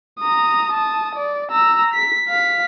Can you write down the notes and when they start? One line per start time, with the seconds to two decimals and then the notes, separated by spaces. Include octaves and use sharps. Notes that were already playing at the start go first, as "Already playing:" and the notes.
0.20 A#5 D#6
0.73 A5 D#6
1.15 D5
1.52 A#5 E6
1.94 B6
2.29 F5 B6